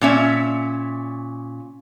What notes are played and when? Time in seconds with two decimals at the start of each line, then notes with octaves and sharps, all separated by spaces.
0.01 A#2 C#4 E5